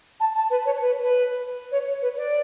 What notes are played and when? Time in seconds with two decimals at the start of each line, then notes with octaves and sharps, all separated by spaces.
0.20 A5
0.35 A5
0.50 B4
0.65 C#5
0.80 B4
1.01 B4
1.72 C#5
1.87 C#5
2.02 B4
2.17 D5